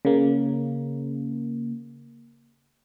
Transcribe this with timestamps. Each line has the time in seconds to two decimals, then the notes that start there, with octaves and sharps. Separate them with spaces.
0.05 C#3 A#3